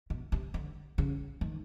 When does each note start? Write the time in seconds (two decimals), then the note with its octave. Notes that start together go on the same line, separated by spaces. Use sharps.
0.10 B2
0.32 C3
0.54 D3
0.98 C#3
1.41 D#3